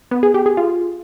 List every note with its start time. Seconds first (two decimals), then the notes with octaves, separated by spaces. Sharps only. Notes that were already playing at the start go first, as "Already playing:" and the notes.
0.11 B3
0.23 G#4
0.34 G4
0.46 G#4
0.57 F4